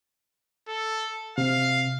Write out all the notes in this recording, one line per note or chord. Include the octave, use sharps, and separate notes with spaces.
A4
C3 F5